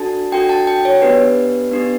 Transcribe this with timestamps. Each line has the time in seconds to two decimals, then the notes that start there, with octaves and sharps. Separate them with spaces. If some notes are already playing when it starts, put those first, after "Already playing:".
Already playing: D4 F#4 A4 A5
0.32 D4 F#4 A4 G5
0.49 A5
0.67 G5
0.85 C#5
1.02 B3 D4 G4 B4
1.71 B3 D4 G4